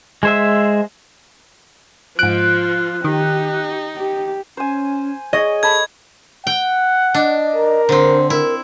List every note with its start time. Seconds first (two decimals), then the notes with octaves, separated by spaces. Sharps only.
0.23 G#3 C5 E5
2.19 G#2 F3 F4 F#6 D7
3.04 D#3 D#4 G4
3.97 G4
4.57 C#4 C5 G#5
5.33 G#4 C#5 D#5
5.63 A4 A5 B5 G#6
6.47 F#5 G5
7.14 D4 D#5
7.56 A#4
7.89 D3 C4 C5
8.30 E4 A#4